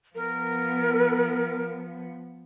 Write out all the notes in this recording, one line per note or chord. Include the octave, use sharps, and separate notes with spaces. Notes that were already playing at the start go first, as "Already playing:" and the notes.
F3 B3 A#4